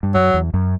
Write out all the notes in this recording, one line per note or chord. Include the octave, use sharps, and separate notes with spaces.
G2
F#2 F#3
E2
F#2